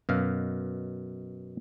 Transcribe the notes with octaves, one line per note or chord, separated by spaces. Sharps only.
F#2 B2 F5